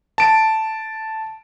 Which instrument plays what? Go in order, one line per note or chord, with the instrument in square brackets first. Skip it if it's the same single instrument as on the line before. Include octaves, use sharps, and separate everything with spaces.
[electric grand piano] A5 D7